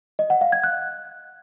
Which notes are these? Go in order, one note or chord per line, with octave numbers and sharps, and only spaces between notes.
D#5
F#5
F5
G#6
F#6